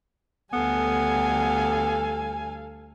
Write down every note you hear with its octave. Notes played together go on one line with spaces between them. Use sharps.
D2 G3 B3 A4 F5 G#5